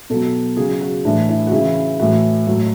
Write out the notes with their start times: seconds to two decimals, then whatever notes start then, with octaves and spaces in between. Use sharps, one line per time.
0.10 B2 F#3 A4
0.57 C#3 F#3 G#4
0.81 F#4
1.05 A2 E3 D4
1.29 E4
1.47 F#4
1.52 C#3 E3 E4
1.99 A2 E3 F#4
2.47 A2 F#3